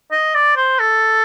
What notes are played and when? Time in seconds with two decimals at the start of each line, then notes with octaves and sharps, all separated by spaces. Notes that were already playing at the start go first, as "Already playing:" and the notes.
0.12 D#5
0.35 D5
0.57 C5
0.80 A4